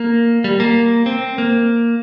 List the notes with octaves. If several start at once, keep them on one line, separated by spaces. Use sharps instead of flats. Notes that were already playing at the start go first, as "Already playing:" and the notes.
Already playing: A#3
G3
A#3
C4
A#3